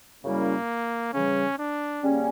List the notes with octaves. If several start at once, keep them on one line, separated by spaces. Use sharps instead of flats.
F#2 C#3 G3 A#3 C#4 E4
C#3 E3 G3 C#4
D4
C#3 G3 A#3 C#4